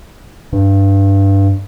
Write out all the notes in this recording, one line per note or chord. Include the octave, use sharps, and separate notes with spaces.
G2